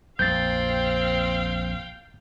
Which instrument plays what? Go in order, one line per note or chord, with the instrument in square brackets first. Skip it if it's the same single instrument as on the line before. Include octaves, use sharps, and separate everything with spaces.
[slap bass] A#1 F2 [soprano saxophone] C4 [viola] F5 G5 [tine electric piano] G6 A6